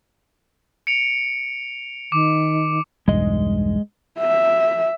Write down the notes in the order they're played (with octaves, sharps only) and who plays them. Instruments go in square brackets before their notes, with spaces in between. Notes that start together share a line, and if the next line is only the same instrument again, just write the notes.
[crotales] C#7 D7 F7
[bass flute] D#3 [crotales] D6
[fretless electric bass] B1 E2 G2 [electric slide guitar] G#3 D#5
[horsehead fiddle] E5